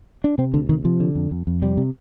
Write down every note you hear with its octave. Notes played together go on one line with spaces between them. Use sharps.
D4
C3 C4
D2 D3
C3 D#3
C3 F3
D3
F2
F2
F2
C3 G3
C3